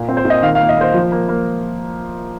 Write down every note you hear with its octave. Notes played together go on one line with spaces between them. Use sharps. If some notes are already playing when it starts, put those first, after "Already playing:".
Already playing: A#2
C4
C5
A#2
D#5
D#3 F5
F5
A#3
D#5
A#3 C5
F3
A#3
A#3